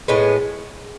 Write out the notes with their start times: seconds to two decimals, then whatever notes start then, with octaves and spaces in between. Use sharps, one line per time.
0.08 A2 G#3 B3